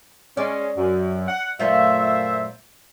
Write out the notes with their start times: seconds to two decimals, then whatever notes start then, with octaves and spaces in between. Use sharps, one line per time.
0.37 G#3 C#4 D5
0.76 F#2
1.28 F#5
1.59 F#2 A#2 A3 F4 C5 E5